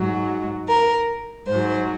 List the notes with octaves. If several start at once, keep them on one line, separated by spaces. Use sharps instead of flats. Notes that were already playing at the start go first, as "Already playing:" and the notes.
Already playing: G#2 F#3
A#4
G#2 F#3 C5